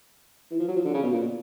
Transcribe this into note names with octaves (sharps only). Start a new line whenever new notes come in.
E3
F3
F#3
F3
D3
C#3
B2
A#2